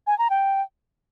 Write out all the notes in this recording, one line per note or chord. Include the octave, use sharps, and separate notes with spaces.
G#5
A#5
G5